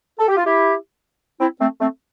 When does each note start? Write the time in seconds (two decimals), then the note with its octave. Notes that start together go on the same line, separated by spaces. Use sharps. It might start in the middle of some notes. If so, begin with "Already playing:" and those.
0.19 A4
0.29 G4
0.37 F4
0.45 E4 G4
1.41 C4 E4
1.61 A3 C4
1.81 A3 C4